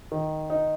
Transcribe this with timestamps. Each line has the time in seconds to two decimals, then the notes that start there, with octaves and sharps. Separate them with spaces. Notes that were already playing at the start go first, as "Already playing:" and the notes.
0.12 D#3
0.50 D#4